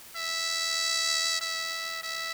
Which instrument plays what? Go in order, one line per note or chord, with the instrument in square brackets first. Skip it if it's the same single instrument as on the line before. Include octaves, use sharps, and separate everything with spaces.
[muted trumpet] E5
E5
E5